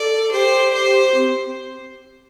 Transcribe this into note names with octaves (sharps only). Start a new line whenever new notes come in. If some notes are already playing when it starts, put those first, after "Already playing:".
Already playing: A4 D5
G4 C5
C5
C4